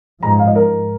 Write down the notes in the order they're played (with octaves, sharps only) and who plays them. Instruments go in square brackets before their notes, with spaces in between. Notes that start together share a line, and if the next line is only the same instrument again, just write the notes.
[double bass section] G#2 F3 G#3 [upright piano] A#5
[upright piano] F5
D#5
A#4